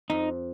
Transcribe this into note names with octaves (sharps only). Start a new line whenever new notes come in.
F2 D#4